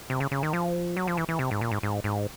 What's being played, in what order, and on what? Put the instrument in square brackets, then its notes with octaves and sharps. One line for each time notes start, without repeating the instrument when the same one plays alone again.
[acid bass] C3
C#3
C#3
D#3
F3
F#3
F3
E3
E3
C3
G#2
A#2
G#2
G#2
G#2